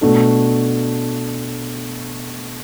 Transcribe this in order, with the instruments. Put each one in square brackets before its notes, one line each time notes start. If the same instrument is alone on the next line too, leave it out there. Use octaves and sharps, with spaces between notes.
[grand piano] B2 A3 D4 A4